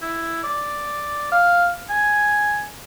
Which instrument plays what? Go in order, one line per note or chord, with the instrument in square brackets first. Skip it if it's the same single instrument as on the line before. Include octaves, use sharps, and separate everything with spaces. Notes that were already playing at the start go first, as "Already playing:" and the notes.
[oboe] E4
D5
F5
G#5